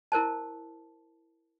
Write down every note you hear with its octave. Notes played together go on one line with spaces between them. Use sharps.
E4 A#4 C5 A5